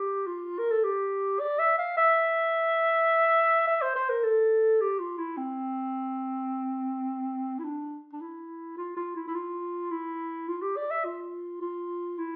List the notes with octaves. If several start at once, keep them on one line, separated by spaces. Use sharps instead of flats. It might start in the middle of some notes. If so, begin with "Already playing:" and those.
Already playing: G4
F4
A#4
A4
G4
D5
E5
F5
E5
E5
C5
C5
A#4
A4
G4
F4
E4
C4
E4
D4
D4
E4
F4
F4
E4
E4
F4
E4
F4
G4
D5
E5
F4
F4
E4